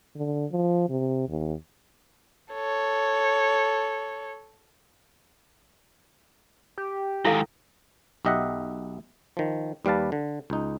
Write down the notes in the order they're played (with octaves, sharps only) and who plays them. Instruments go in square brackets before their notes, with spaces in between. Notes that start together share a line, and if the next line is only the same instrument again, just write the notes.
[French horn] D3
F3
C3
D#2
[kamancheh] A4 C#5
[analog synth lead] G4
[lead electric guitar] G#2 D#3 [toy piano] E4 A4 F5
[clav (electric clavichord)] B1 G4 D#5 E5 F#5
D#3 F3
D#2 G3 B4 F5 A5
D3
C#2 D#4